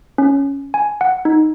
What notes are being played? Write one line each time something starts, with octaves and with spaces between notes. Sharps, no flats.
C#4
G#5
F#5
D#4